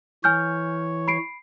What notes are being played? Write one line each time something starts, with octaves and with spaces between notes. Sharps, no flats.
E3 C#5 G#5 F6 G6
B5 C7 D7